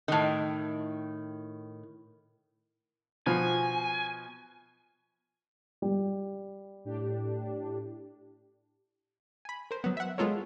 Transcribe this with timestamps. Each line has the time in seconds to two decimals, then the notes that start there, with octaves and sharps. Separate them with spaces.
0.08 A2 D#3
3.26 B2 F3 G#5
5.82 G3
6.85 A2 D4 G4
9.45 G#5 B5
9.71 A#4 C5
9.84 F#3 B3
9.97 E5 F#5
10.18 G#3 B3 F4 A4 A#4 C#5